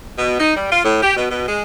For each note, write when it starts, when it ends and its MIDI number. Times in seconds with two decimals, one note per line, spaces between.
0.17 0.35 47
0.38 0.50 63
0.55 0.69 55
0.71 0.82 65
0.83 0.98 45
1.02 1.13 67
1.15 1.25 47
1.29 1.43 47
1.47 1.63 56